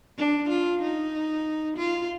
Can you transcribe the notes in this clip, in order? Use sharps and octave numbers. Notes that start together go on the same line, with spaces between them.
D4
F4
D#4
F4